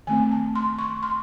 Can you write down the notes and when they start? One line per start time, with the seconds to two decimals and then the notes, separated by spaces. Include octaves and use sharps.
0.07 D#3 A3 C4 G#5
0.31 A5
0.55 C6
0.79 C#6
1.03 C6